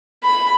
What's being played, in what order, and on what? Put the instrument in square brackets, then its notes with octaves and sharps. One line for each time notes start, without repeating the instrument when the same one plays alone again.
[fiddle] B5